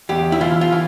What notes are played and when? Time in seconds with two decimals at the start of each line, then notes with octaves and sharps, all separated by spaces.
0.09 E2 G4
0.32 E4
0.41 E3 F4
0.61 F4
0.72 E3